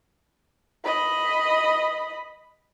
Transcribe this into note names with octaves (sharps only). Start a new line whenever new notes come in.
D#5 B5